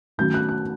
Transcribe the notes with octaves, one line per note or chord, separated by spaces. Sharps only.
D#3 F#3 A3 C#4 G6
F#6
F#6